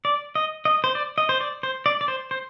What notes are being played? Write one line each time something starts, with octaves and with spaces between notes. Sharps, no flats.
D5
D#5
D#5
C5
D5
D#5
C5
D5
C5
D5
D5
C5
C5